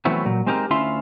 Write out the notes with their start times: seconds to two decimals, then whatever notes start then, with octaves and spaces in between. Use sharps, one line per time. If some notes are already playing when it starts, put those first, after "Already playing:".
0.05 E3 F#3 A3 B3 C4
0.25 A#2 F#3
0.46 G#3 C4 D#4 G4 A4 A#4
0.70 D2 C#4 E4 F4 E5 C6